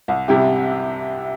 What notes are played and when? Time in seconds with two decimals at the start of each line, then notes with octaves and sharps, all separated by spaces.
0.08 C2
0.28 C3 G3 E4 G4